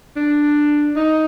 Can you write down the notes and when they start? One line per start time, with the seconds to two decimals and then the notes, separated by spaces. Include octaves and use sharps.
0.16 D4
0.96 D#4